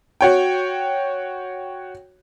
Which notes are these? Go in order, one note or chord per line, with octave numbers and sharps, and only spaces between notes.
F#4 C#5 G5